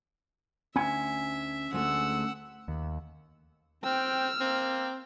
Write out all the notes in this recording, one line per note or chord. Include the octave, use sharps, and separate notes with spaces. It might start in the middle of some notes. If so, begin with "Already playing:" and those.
D2 C#4 E5 G#5
D2 G#3 A3 F#5 E6
D#2
C4 G5 E6 F6
A#3 C4